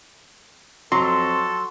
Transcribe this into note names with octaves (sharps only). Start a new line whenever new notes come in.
F2 F#3 A4 C6